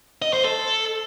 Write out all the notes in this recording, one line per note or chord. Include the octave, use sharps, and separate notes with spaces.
D#5
C5
A4